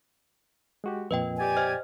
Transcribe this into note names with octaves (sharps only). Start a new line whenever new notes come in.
G#3 F#4 G4
F2 A#2 B4 D#5 G5
G4 D5 G#5
C5 D#5 F6